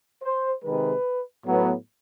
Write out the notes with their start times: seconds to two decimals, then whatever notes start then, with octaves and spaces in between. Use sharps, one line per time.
0.23 C5
0.64 C3 D#3 G#3 B4
1.44 A2 F#3 B3